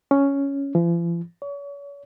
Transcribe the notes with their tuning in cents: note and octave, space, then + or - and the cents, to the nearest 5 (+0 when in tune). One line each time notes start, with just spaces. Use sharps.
C#4 +5
F3 -45
C#5 +40